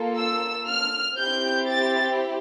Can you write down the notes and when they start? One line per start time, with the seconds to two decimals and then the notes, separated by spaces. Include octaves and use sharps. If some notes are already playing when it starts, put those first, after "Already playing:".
Already playing: A#3 F4 A4
0.18 E6
0.68 F6
1.17 C4 E4 G4 G6
1.67 A6